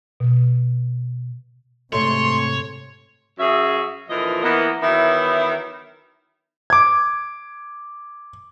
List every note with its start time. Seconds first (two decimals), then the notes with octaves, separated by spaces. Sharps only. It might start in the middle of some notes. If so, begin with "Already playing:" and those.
0.20 B2
1.93 G#2 C3 A3 C#5 C6
3.39 F#2 F#4 G#4 C#5 E5
4.08 A#2 D3 E3 F3 A#4 D#5
4.43 E3 A#3 B3
4.81 D#3 E3 F#3 B3 E4
6.70 D6 G#6